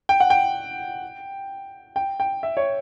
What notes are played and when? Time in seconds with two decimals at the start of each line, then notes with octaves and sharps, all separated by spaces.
0.09 G5
0.20 F#5
0.30 G5
1.96 G5
2.20 G5
2.43 E5
2.57 C#5